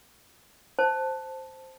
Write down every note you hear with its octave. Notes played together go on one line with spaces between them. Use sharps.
C5 A5